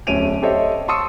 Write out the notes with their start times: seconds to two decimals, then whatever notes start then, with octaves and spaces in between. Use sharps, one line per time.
0.07 D1 A3 C#4 D7 D#7 F7
0.42 G4 A4 C5 C#5 D#5 E5
0.88 A5 C6 C#6 D#6 E6 C#7